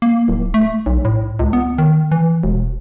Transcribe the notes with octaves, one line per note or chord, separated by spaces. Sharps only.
A#3
D1
A3
B1
A2
C#2
B3
D#3
E3
E1